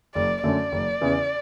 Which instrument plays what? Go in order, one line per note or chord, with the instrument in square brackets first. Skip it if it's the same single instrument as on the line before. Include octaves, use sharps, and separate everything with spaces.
[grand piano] F#1 [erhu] D5
[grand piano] F#2 D3 A3 C#4 [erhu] D5
[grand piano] F#1
E2 C#3 E3 B3